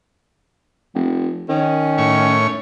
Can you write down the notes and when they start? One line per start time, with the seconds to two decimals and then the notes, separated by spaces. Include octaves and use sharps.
0.95 F1
1.49 D#3 C#4
1.98 A2 C#5